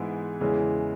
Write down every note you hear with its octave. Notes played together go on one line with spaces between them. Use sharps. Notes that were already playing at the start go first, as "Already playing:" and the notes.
Already playing: G#2 E3 G#3 B3 E4
E2 C#3 E3 G#3